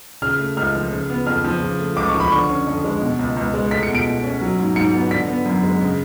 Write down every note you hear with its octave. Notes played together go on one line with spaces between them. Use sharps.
C#3 F6
A3
C#2 F6
F3
C#3
B3
F2 F6
F3
C#3
A3
C#2 D6
C#6
F3
B5
D3 C#6
C#4
F2
G#3
B2
C#2
C#2
G#3
A3 B6
C#7
B2
D7
B2
C#4
F#3
G#2
G#2 C#7
B3
D3 B6
B3
F#2
G#3
C#3